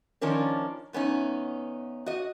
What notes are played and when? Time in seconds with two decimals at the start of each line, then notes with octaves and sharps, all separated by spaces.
0.21 D#3 F3 C#4 D4 A#4
0.93 E2 B3 C#4 D#4
2.06 F#4 D#5